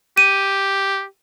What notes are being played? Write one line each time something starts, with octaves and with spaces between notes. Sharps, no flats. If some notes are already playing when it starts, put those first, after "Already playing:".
G4 D#7